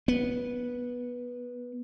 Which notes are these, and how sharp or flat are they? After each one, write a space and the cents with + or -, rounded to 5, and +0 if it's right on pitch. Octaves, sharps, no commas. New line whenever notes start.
B3 -15